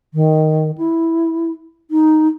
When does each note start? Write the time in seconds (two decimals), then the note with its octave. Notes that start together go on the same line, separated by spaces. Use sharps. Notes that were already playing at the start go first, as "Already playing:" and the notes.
0.14 D#3
0.78 E4
1.90 D#4